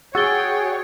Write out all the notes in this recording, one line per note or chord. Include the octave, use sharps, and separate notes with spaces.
F#4 G#4 C#5 G5 E6 A6 G7